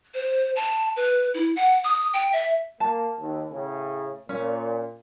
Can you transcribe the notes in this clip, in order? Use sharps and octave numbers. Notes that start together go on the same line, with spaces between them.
C5
A5
B4
E4
F#5
D#6
G5
E5
A#3 A5
D#2
A2 C#3
A#2 C#4